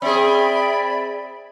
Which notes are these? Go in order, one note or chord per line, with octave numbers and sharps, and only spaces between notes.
C4 G#4 D5 E5 B5